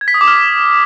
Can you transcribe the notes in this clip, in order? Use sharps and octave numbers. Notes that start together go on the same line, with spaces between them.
G#6
B6
D#6
D6
F6